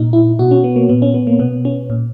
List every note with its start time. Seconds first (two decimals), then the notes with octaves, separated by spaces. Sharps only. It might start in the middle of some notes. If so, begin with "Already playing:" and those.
Already playing: A#2 D#4
0.13 E4
0.39 B2 F#4
0.51 C#4
0.64 B3
0.76 A#3
0.89 A#2 B3
1.02 C#4
1.14 B3
1.27 A#3
1.39 B2 B3
1.65 C#4
1.90 A#2